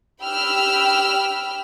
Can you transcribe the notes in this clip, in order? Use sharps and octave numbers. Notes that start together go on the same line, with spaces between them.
G4 G5 B5 E6 F6